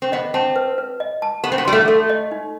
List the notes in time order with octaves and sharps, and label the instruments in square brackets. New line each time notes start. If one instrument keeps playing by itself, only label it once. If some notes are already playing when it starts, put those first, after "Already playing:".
[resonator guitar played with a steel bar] C4
[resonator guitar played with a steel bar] B3 [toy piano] D#5
[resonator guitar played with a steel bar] C4 [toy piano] A5
[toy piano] B4
B4
D#5
A5
[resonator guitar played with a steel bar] B3 [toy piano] G4
[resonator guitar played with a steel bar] C4
B3
[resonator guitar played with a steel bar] G3 [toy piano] C6
[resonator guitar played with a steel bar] A3
[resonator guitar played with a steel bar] A3 [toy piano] A4
[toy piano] D#5
D#4